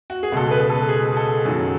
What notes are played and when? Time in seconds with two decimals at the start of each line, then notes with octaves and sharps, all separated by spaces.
0.10 F#4
0.23 G#4
0.32 C#2 B2 G#3 A4
0.51 B4
0.70 A4
0.89 G#4
1.17 A4
1.45 F#2 D#3 F#3